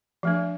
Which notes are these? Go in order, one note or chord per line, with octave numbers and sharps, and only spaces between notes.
F3 A3 D4